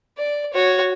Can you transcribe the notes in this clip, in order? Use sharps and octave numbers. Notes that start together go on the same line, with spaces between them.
D5
F#4 C#5